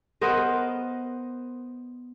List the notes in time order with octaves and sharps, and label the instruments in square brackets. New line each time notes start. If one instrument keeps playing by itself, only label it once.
[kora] B3 A#4 C5 D#5